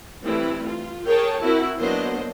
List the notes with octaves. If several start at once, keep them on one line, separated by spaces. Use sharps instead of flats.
E3 G3 A3 C4 E4
F4
G#4 A#4 C#5 G5 A5
C4 E4 F#4 A#4
F#3 A#3 B3 D4 C5 D#5